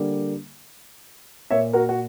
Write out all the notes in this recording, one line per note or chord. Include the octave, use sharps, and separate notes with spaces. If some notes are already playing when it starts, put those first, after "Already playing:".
Already playing: D3 G3 A#3
A#2 A#3 C#5 E5
F#4 A#4
F#4